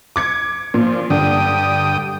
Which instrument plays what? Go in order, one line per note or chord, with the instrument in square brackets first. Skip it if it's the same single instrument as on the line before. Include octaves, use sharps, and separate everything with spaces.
[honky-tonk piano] D6 G#6 C#7
[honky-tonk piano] A#2 [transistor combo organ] F3
[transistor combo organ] G2 G5 D#6 [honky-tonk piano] D3